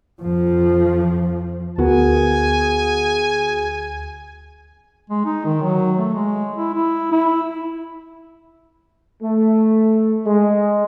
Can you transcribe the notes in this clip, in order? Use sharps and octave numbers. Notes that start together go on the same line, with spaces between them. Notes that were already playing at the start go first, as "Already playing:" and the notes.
F2 F3
D2 B3 F#4 G#4 A#4 G#5
G#3
D#4
D#3
F#3
A3
G#3
E4
E4
E4
A3
G#3